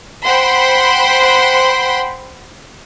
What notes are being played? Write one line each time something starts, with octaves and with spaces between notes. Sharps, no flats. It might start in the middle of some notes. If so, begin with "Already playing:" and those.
C5 F#5 G5 B5 C6